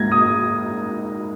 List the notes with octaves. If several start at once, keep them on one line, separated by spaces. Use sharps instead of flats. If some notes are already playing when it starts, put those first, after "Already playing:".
Already playing: G#2 A#3 G#6 A#6
D#6